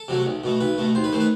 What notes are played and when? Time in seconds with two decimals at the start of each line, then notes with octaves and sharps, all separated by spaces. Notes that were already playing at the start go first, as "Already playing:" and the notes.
Already playing: A4
0.08 C3 F#3 A3
0.26 B1
0.44 B2 A3
0.60 B1 B4
0.78 B2 A3
0.95 D#2 C5
1.04 B4
1.13 D#3 A3 C5
1.20 B4